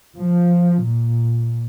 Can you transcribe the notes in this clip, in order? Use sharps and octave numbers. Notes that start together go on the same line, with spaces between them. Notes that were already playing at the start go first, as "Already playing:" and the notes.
F3
A#2